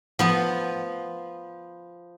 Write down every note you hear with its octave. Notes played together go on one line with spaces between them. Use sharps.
F3 B3